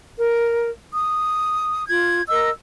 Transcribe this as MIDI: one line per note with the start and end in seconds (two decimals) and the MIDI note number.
0.18 0.69 70
0.92 1.87 87
1.88 2.22 65
1.88 2.22 92
2.29 2.50 70
2.29 2.50 75
2.29 2.50 88